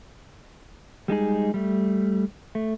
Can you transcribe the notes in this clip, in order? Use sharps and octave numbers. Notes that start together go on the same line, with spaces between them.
G3 G#3 D#4 G#4
G3 A3
A3